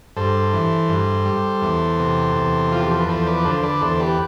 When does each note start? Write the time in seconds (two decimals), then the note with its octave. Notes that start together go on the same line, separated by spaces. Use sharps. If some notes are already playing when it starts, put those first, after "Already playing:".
0.16 G2 A4 C5
0.53 E3
0.89 G2
1.25 G3
1.62 E2
1.99 C3
2.35 E2
2.72 F3 F4
2.81 G4
2.91 A4
2.99 B4
3.08 E2 A4 C5
3.23 C5
3.26 B4 D5
3.45 D3 A4 C5
3.63 B4 D5
3.81 E2 A4 C5
4.00 G4 B4